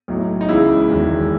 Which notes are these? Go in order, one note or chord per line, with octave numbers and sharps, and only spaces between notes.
B1 A2 F#3
D#4
C#2 C#3 E3 E4
E1 E2 D#3 F#3